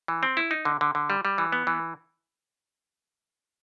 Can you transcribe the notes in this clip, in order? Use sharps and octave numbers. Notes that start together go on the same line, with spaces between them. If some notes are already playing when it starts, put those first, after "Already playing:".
E3
C4
E4
D#4
D3
D3
D3
G3
G3
E3
B3
E3